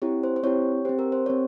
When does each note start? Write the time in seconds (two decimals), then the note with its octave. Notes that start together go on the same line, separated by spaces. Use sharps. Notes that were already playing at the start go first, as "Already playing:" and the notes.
0.02 C4 E4 G4 C#5
0.23 C5
0.36 C5
0.43 C4 E4 G4 C#5
0.85 C4 G4 C5
0.99 A#4
1.12 C5
1.26 C4 G4 C#5